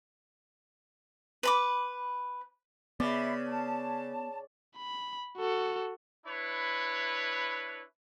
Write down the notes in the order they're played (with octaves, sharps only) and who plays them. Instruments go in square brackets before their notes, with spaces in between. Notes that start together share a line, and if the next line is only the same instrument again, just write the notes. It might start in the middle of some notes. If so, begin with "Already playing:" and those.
[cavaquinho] B4 B5 D6
[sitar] C#3 [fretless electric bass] B3 [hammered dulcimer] D5 [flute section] E5 B5
[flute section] A5
[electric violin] B5
F#4 A4
[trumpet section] D4 E4 B4 C#5